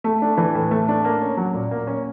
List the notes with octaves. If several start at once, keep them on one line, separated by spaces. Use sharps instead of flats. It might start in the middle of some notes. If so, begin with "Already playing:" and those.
A3
D4
E3
A2
A3
D4
A#3
C#4
F#3
A#2
A#3
C#4